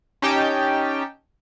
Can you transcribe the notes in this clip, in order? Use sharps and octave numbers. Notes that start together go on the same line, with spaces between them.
C#4 D#4 G4 G5 A5